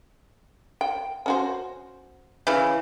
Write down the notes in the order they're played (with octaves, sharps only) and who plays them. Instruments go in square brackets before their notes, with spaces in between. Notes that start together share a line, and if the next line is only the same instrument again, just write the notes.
[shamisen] G5
C#4 F#4 C5
[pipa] C#3 E3